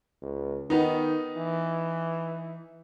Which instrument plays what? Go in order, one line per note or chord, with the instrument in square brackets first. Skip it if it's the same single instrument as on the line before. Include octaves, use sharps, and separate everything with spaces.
[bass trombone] C#2
[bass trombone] D#3 [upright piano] B3 D#4
[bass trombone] E3